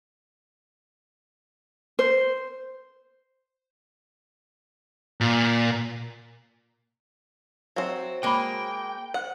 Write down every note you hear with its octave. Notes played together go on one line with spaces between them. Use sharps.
C5
A#2
F#3 C4 E5
G#3 A#3 C#5 G5 B5
C5 F#5